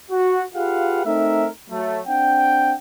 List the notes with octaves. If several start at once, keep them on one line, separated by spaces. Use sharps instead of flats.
F#4
F4 G4 G#4 B4 F5 F#5
A3 C4 D#4 A#4 E5
F#3 A3
C4 D4 F#5 G5